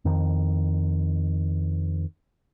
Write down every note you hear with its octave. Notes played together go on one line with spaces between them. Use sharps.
F2 D#3